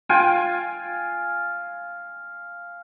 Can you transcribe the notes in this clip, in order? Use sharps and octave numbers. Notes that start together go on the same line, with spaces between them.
F4 G5 G#5